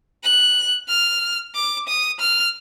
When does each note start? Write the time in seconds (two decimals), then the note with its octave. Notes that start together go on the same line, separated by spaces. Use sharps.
0.24 F#6
0.89 F6
1.55 D6
1.88 D#6
2.20 F6